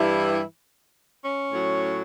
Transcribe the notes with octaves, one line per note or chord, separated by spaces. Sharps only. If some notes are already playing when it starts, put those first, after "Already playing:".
Already playing: G2 E3 G3 E4
C#4
A2 F#3